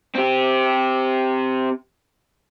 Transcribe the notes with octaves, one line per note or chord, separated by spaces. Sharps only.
C4 G4